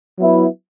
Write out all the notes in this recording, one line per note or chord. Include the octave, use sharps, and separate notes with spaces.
F#3 B3 E4 B4